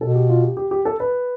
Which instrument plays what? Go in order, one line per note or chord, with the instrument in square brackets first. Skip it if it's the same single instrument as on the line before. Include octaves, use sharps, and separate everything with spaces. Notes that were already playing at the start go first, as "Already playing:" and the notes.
[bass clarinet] B2 [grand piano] A4
[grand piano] G4
F4
G4
G4
G4
A4
B4